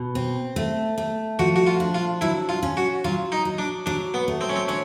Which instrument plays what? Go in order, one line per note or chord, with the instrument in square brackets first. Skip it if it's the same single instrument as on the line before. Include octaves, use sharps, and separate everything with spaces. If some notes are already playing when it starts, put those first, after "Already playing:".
Already playing: [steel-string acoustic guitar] B2
C4
A3
A3
[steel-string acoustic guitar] F3 [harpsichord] F#4
[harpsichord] F#4
F4
[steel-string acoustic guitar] D4
[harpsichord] F4
[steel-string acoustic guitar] F#3 [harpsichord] E4
[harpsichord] F4
[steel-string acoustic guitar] C#4
[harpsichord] F#4
[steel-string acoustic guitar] F#3 [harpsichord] F4
[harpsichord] D#4
[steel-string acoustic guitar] F#3
[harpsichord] D4
[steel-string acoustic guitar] F#3 [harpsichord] D4
[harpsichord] B3
[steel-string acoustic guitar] A3
[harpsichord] C4
C#4
C4
[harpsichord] C#4 [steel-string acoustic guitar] D4